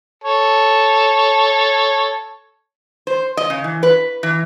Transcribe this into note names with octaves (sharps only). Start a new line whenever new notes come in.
A4 C#5
C5
D#5
C#3
E3
B4
E3